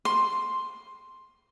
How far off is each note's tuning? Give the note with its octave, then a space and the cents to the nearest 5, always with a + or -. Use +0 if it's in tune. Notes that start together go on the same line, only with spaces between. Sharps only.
C6 +5